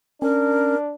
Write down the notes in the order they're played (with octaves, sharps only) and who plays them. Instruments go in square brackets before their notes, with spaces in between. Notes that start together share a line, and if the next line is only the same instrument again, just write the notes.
[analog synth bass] C#4 [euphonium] D4 [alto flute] A#4